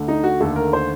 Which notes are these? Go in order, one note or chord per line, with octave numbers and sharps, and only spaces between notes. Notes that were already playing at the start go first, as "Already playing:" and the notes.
Already playing: D2 D3 A3
D#4
F#4
D#2 D3 A3 A4
A#4
C5